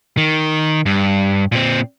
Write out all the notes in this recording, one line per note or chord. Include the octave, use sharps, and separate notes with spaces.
D#3
G2
A#2 C4